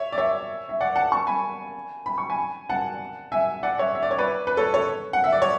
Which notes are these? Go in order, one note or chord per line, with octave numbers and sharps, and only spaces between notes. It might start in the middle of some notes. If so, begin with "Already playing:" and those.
Already playing: C#5 E5
D5
C#5 E5
E5
D5 F#5
F#5 A5
A5 C#6
G#5 B5
B5
C#6
G#5 B5
F#5 A5
E5 G#5
D5 F#5
C#5 E5
E5
D5
C#5
B4 D5
B4
A4 C#5
A4 C#5
F#5
E5
D5
C#5